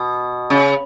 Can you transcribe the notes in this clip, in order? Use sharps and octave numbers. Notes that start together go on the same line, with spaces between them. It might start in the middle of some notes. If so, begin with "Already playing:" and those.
Already playing: B2
C#3